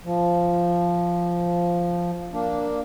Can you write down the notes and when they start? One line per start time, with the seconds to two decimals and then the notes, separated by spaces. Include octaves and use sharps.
0.05 F3
2.33 A#3 D4